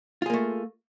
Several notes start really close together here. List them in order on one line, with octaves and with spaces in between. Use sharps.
F4 G#4 A#3 A3